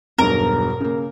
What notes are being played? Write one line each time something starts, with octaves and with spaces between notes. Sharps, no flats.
E1 B1 G2 A#4
C#3 A#3